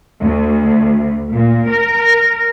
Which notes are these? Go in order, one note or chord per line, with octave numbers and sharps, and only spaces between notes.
D2
A#2
A#4